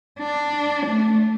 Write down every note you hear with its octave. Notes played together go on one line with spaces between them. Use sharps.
D4
A3